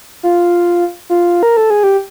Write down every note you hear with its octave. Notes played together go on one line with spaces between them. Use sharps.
F4
F4
A#4
A4
G#4
G4